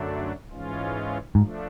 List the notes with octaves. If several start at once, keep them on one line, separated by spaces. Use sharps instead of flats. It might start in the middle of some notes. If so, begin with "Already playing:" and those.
Already playing: F#2 D3 F#3 A3 D4
G#2 E3 G#3 C#4 F4
G#2 F3 A3 D4